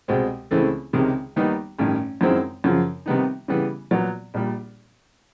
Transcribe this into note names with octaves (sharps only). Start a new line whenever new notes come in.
C2 B2 G#3 C4
C#2 C#3 E3 A3 C4
C#2 C3 D#3 G#3
D#2 D#3 G3 B3 D#4
A1 G2 D#3
F#2 D#3 G#3 C4 E4
F#2 C#3 F3
C3 D#3 G3 B3 D#4
C#3 E3 G3 B3
A#2 F#3 B3
A#1 A#2 G3